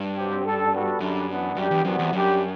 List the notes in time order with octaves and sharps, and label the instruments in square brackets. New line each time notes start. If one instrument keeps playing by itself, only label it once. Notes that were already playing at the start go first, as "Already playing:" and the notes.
Already playing: [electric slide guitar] G2
[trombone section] C3 F#3 C4 G4
G3 D4 A4
G3 B3 F#4 A4
[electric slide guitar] F#2 [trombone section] D3 G3 D4
[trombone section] E3 B3 D4
[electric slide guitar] F#2 [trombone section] G3 D4 G4
[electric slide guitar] E2
[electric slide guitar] F#2 [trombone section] C3 E3 G3 B3 F#4
[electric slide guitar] E2
[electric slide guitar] F#2 [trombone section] G3 D4 G4